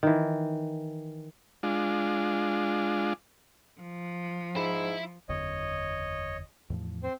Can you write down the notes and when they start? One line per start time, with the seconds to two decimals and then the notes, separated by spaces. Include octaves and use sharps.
0.03 D#3 E3
1.63 G#3 D4 F4
3.81 F3
4.56 G#2 E4
5.29 F#1 E2 D3 C#5 D#5
6.70 E2 A2 F3
7.03 C4 C5